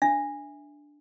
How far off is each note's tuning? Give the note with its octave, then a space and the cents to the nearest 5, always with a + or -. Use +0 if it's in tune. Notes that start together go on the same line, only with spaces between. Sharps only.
D4 +0 E5 +0